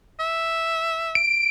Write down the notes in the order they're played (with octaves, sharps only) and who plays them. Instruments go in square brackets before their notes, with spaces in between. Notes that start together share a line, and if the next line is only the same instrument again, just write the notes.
[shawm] E5
[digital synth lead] D7